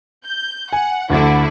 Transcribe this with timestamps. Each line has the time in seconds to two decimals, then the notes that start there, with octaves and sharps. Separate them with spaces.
0.25 G6
0.73 F#5 G#5
1.10 D2 D3 E4